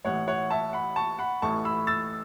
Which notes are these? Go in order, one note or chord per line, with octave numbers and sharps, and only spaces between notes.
A1 A2 E3 C#5 F#5
C#5 F#5
E5 A5
F#5 B5
A5 C#6
F#5 B5
A1 A2 E3 A3 A5 C#6
B5 E6
E6 A6